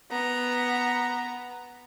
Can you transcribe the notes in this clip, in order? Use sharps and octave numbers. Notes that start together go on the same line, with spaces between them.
B3 A#5